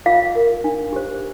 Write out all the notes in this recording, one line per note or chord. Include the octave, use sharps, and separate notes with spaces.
F4 F5
A#4
D4
G4 C5